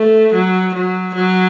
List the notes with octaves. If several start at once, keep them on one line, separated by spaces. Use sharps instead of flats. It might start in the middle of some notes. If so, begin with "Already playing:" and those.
Already playing: A3
F#3
F#3
F#3